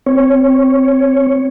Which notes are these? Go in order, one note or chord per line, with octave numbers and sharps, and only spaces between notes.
C4 C#5